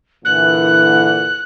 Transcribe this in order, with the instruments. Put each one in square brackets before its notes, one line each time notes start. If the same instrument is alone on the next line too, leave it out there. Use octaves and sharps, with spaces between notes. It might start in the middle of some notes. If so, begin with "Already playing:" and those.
[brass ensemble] A#2 D3 E3 [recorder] F#6